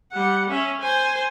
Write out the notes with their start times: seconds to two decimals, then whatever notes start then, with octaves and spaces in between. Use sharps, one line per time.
0.13 G3 F#5
0.50 C#4 E5
0.80 C5 G#5